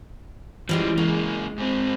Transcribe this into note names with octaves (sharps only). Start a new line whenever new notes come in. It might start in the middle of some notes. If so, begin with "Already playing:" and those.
E3 F3 G3 G#3 C#4
C#3 G#3 A#3
G#2 C4